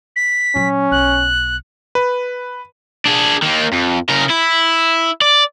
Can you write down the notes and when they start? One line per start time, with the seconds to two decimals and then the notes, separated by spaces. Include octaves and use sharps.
0.16 B6
0.55 A#2 F#3 C#4
0.91 B1 F#6
1.95 B4
3.06 D4 G#4
3.42 D#3 A#3
3.73 F2
4.09 C#3 A#4
4.30 E4
5.22 D5